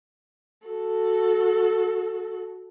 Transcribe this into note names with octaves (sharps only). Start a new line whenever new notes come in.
F#4 A4